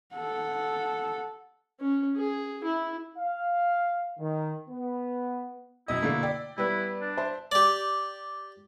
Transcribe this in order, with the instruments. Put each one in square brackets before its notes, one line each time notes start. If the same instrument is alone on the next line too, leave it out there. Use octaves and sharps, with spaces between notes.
[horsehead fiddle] A4 F#5
[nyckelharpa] C#4
G#4
E4
[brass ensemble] F5
D#3
B3
[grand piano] F#2 B2 D#5 [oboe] E4
[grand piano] B2 D3 A#3 [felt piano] A3
[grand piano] D5 [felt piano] G5
[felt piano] G3 B3 B4 [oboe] E4
[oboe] D4
[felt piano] C5 E5 A5
[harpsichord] G4 D5